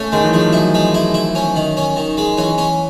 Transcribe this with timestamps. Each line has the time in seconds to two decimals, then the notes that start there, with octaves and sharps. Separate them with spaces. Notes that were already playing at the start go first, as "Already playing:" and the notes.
Already playing: A3 C#4
0.12 D#3 G#3
0.24 E3
0.33 F3 G#3
0.46 F#3
0.53 E4
0.74 G#3
0.94 E4
1.14 E4
1.35 C#4
1.56 D#3
1.77 C#4
1.96 D#3
2.17 G#3
2.37 E3 C#4
2.58 C#4